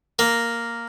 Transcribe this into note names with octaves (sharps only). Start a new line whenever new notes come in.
A#3